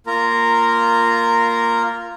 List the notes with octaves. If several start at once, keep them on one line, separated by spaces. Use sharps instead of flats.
A#3 F4 A#4 A#5